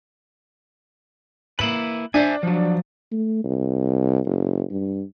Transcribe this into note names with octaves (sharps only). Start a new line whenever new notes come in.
A#3 E4 B4 F#7
D4 C5 E5 G#5
F3 F#3
A3
C2
F#1
G2